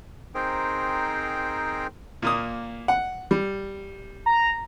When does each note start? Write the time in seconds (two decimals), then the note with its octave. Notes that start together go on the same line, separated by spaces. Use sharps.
0.35 C4 D#4 G#4 A#4 C5 G5
2.22 A#2 A#3 D#6
2.88 F#5
3.31 G3
4.26 A#5